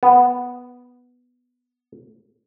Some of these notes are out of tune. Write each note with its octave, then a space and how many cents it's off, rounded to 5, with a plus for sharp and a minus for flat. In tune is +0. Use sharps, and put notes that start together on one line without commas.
B3 +0